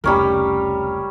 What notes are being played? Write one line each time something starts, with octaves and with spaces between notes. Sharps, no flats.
F1 C#2 G3 C#4 A#4